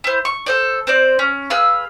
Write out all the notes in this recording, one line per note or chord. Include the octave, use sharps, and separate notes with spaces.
E4 C5
C#6
A4 C5 D5
C4 C5 D5
C#4
G#4 B4 F5 E6